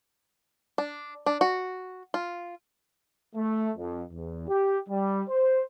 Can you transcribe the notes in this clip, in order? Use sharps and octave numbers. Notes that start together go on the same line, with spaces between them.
D4
D4
F#4
F4
A3
F2
E2
G4
G3
C5